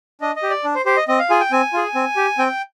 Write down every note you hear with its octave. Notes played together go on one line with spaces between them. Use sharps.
D4 D#5
D#5
G4
D5
D4
C5
G4 C5
D#5
C4 D#5
F5
F4 G#4 G#5
G5
C4 G#5
F4 G#4
C4
G4
C4 G5